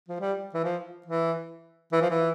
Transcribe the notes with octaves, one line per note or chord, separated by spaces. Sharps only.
F3
G3
E3
F3
E3
E3
F3
E3